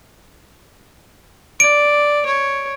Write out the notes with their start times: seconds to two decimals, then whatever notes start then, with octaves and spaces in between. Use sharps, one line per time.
1.60 D5 D7
2.26 C#5